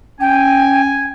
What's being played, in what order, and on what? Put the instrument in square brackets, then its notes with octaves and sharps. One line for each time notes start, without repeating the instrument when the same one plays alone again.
[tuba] C#4 [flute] G5 [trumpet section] G#5